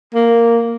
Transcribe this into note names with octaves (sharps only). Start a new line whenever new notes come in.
A#3